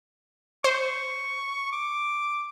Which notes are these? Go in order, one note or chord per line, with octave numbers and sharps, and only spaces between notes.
C5 C#6
D6